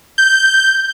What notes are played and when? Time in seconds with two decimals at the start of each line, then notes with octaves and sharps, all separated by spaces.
0.18 G6